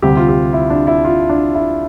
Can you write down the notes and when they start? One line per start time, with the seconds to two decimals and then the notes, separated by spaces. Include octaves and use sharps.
0.02 D2 C3 G3 G4
0.17 F4
0.29 G4
0.53 E4
0.70 D4
0.87 E4
1.05 F4
1.29 D4
1.55 E4